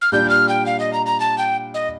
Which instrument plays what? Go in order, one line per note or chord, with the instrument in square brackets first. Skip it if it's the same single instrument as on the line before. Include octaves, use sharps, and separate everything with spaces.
[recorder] F6
[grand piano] A#2 G3 D4 G4 [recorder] G6
[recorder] F6
G5
F5
D#5
A#5
A#5
A5
G5
D#5